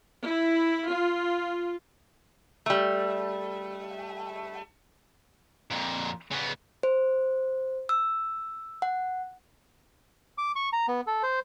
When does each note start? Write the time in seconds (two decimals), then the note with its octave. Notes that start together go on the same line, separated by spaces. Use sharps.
0.23 E4
0.87 F4
2.66 G3 A3
5.71 F2 A#2
6.31 C#3 B3
6.83 C5
7.89 E6
8.82 F#5
10.38 D6
10.56 C#6
10.73 A#5
10.88 B3
11.07 A4
11.23 C5